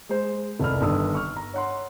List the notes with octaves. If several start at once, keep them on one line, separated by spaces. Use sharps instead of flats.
G#3 C5
F1 C2 D5 B5 F6
G1 G2 D#3 D#6 E6
C#6 F6
A#5
C#5 F#5 C6